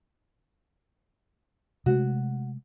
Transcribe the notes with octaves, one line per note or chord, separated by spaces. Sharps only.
C3 G#3 A3 F#4